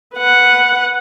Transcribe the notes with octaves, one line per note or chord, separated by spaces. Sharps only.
B4 F#5